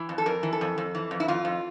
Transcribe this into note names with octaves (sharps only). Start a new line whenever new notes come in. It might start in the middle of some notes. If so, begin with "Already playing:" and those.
Already playing: E3
F2
A4
F2 A#4
E3
A4
F2
F2
E3
F2
E4
F2 F4
F2